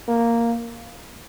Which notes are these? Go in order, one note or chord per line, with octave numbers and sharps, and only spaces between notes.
A#3